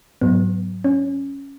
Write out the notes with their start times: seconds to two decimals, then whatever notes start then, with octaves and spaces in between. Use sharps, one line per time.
0.21 G#2 F#3 B3
0.84 C#4